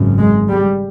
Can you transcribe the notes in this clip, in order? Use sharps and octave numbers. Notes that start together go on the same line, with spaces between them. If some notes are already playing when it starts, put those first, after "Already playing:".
Already playing: G#1 F#2 C#3
G#3
G3